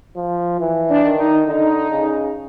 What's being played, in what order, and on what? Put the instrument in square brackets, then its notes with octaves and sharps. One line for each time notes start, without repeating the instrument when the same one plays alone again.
[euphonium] F3
E3
[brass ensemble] D4
[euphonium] D#3
[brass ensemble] D#4
[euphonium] D3 [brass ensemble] D#4
[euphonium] C#3